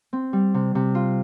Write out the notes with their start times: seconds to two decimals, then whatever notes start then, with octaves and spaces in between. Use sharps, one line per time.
0.13 C4
0.33 G3
0.54 C3
0.75 C3
0.95 F4